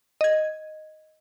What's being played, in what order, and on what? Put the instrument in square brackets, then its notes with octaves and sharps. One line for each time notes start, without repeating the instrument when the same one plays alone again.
[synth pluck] D#5 G#6